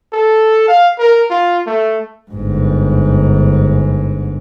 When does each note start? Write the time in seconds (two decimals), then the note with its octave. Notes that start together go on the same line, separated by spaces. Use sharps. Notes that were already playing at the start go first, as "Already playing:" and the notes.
0.13 A4
0.68 F5
0.99 A#4
1.30 F4
1.66 A3
2.31 G1 G#2